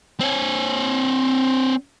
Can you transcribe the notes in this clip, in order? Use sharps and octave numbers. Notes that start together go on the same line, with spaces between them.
C4 C#5